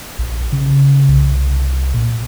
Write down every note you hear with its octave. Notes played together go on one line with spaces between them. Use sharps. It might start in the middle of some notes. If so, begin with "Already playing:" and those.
A#1
C#3
C2
A#2